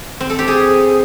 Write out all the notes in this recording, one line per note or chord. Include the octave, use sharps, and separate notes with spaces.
C4
A4
G4
G#4